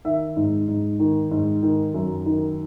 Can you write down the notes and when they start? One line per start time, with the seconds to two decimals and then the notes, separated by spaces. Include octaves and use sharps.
0.05 D#3 E5
0.36 G#2
0.68 G#2
1.00 D#3
1.31 G#2
1.63 D#3
1.94 F#2
2.26 D#3